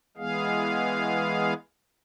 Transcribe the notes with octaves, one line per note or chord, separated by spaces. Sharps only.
E3 G#3 B3 G#4 F5